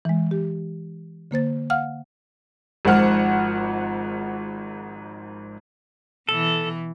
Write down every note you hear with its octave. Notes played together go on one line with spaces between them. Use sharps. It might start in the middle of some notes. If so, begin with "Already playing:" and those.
E3 G#3
G4
D3 A#3 C5 A6
F5 F#5 F6
G#1 G#2 F3 F#5 F6
B2 E3 A4